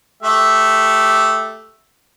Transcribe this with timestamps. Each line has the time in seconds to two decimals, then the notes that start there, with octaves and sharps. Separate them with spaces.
0.23 A3 G4 E5